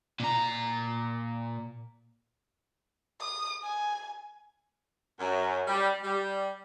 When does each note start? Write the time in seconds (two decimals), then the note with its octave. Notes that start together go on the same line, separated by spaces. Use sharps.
0.20 A#2 A#5
3.20 D#6
3.63 G#5
5.19 F#2
5.67 G3
6.02 G3